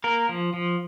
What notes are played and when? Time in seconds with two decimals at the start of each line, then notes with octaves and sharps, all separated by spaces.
0.04 A#3 A#4
0.29 F3
0.54 F3